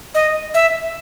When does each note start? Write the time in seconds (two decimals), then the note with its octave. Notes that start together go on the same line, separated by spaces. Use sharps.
0.15 D#5
0.54 E5